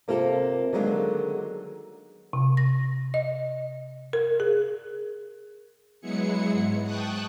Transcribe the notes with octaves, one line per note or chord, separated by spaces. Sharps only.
C3 A#3 C4 F4 A4
D3 D#3 F#3 G#3 A#3 B3
C3
A#6
D#5
A#4
G#4
F#3 G#3 B3 E4 G#4 C#7
G#2
G5 A5 C#6 D#6 F#6